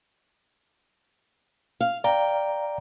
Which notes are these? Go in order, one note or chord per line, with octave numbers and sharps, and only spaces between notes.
F5
D5 F5 G5 A#5